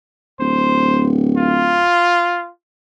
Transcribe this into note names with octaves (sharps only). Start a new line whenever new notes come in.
D1 C5
F4